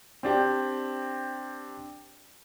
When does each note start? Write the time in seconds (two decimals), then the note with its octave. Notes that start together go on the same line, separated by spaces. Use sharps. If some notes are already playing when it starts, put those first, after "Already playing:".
0.23 C4 D4 G4